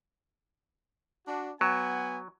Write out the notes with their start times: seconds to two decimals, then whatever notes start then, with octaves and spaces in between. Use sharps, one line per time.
1.27 D4 F#4
1.61 F#3 B3 F#5 G#5